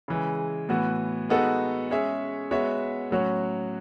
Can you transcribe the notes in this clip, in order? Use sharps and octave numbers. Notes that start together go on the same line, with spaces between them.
C#3 E3 G#3
A2 E3 B3 F#4
G#3 B3 D#4 F#4 A4
G#3 C#4 G#4 C#5 E5
G#3 B3 F#4 C#5 E5
A2 F#3 C#4 F#4